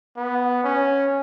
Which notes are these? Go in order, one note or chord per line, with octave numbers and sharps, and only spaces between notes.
B3
C#4